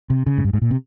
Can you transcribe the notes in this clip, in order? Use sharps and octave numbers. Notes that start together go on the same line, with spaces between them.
C3
C#3
G#2
G2
G#2
A#2
C3